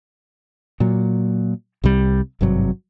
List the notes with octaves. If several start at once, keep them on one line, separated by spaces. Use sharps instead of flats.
A#2 F#3
C2 C3 G3
G#1 G2 C3 F#3